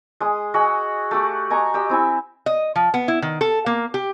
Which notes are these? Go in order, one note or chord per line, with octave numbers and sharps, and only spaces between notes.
G#3 D#6
F#4 G#4 D#5 E6
A3 F#4 G4
D#5 G#5 A#5 C#6
G4 D#5 E6
C4 E4 G#5
D#5
F3
B3
E4
D#3
A4
A#3
G4